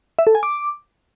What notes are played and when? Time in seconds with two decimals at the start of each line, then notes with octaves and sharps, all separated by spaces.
0.19 E5
0.27 A4
0.35 G#5
0.43 D6